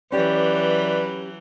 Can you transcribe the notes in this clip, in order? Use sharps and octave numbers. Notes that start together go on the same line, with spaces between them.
E3 F#3 C#4 G4 B4 D5